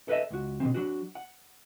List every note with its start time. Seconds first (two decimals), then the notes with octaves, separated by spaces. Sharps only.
0.08 A4 B4 C5 D#5 E5
0.31 C#2 F#4
0.60 B2 D3 E3 C4
0.74 F#3 D4 F#4
1.15 F#5